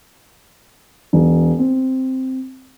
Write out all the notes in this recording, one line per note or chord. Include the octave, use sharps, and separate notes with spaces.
E1
C4